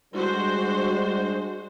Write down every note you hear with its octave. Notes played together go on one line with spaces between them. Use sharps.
G3 G#3 D4 F#4 C5